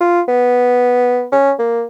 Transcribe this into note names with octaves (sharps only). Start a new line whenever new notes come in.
F4
B3
C#4
A#3